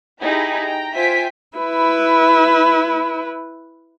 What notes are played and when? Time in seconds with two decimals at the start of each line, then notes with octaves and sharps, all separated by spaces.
0.21 D#4 E4 G4 G#4 G5 B5
0.63 G5 A#5
0.95 F4 C5 E5 G5 G#5 B6
1.58 E4 B4